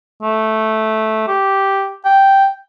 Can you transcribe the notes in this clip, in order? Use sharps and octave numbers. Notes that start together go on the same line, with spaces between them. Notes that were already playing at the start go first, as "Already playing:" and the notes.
A3
G4
G5